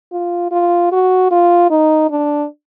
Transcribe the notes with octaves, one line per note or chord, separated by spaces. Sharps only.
F4
F4
F#4
F4
D#4
D4